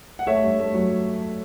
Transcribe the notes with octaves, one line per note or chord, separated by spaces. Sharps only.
F#5
A3 C#5 E5
G2
A3
F#3